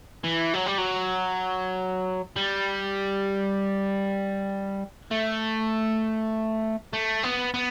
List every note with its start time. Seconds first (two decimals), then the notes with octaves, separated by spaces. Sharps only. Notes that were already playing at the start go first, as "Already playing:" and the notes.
0.24 E3
0.54 F#3
0.66 G3
0.78 F#3
2.36 G3
5.11 A3
6.93 A3
7.23 B3
7.54 B3